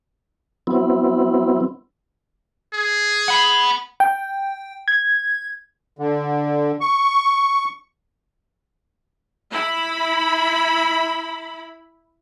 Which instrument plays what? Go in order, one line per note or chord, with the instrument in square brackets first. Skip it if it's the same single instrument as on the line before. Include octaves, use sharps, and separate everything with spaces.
[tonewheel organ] F#3 B3 C4 E4
[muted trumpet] G#4
[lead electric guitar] F#5 B5
[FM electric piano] G5
G#6
[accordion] D3
C#6
[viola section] E4 B5